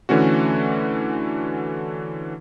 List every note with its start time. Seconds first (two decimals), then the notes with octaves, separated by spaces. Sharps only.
0.09 D3 E3 A3 C#4 F#4